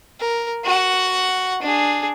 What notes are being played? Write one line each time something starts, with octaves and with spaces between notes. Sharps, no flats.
A#4
F#4 F#5
D4 G#4